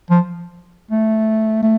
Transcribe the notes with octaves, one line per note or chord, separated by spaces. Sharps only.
F3
A3
A3